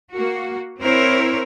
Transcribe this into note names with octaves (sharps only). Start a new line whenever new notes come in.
A#3 F#4
C4 E4 A#4 C5 C#5